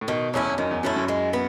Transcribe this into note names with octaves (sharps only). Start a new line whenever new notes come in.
A2
B2 D#3
E2 F#3 A3 C#4 E4
E2
F#2 D#3
E2
F#2 F#3 A3 C#4 E4
F#2
G#3
B3